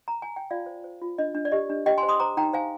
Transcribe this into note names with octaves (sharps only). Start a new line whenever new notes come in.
A#5
G#5
G5
F4 D5 F5
C5
C5
F4
D4 D#5
D4
D5
G4 D#5
D4
G4 D#5 G5
G#5 C6
C5
C6 D#6
C5 A#5 D6
D#4 G5 A#5
C5 F5 G#5